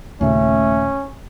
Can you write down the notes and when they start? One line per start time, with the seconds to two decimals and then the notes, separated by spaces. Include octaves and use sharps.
0.21 D#2 A#2 C#3 A3 C#4